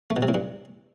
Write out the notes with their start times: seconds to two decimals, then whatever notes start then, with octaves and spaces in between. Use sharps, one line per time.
0.10 A3
0.16 B2
0.22 C3
0.28 A2
0.34 G2